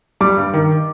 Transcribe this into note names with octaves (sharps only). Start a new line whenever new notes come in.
G3 D6
G2
D#3